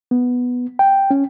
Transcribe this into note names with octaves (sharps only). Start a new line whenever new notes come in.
B3
G5
C#4